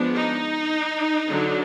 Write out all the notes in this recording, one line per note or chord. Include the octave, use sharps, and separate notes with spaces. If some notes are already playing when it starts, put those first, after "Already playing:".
Already playing: F3 G#3 B3 D4
D#4
D3 F#3 D4